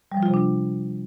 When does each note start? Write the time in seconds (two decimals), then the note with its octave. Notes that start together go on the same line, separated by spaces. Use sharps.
0.12 G3
0.17 F3
0.23 F4
0.28 C3
0.34 D4